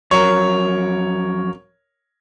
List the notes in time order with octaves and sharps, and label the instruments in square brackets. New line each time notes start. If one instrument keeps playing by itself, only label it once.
[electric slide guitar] F2 F#3 [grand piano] A#4 C#5